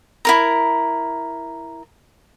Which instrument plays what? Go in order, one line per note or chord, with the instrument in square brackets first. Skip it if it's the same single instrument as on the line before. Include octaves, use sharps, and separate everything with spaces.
[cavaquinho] E4 A#4 A#5